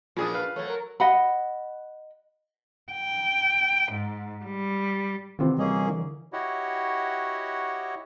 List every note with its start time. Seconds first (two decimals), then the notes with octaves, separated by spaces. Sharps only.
0.17 A#2 F3 D4 G#4 D#6
0.34 B4 F5
0.56 F#3 A3 C#5
0.68 A#4
1.00 D#5 F#5 B5
2.92 G5
3.93 G#2
4.45 G3
5.39 D2 C3 D#3 E3 C4 F4
5.59 G3 A#3 C#4 G#4 D#5
5.87 D3 E3 A#4
6.33 E4 F#4 G4 C#5 D#5 F#5